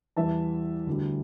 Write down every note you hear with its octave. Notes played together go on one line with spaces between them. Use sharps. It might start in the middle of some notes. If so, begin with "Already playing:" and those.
E2 E3 G3 E5 A5
D2 D3 G3